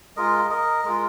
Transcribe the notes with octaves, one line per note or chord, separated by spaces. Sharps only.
G#3 F4 A#4 D#5
A#4 D#5
G#3 F4 A#4